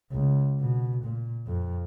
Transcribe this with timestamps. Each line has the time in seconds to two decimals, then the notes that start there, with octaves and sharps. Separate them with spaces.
0.12 C#2
0.61 B2
1.05 A#2
1.47 F2